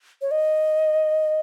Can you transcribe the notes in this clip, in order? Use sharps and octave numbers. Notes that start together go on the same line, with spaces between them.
C#5
D#5